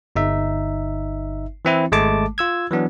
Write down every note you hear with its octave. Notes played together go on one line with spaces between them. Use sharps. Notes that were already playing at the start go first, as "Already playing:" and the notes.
G1 D#4 E5
E3 C4 E4
G#1 G#3 A3 A5 D6
F4 E6 G#6
E3 F#3 B3 D4